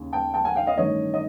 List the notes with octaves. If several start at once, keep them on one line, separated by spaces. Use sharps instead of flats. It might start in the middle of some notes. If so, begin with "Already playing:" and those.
Already playing: D#2 C#3
G5 A5
G5 A5
F#5 G#5
F5 G5
D#5 F5
A1 G2 D#3 C#5 D#5
D#5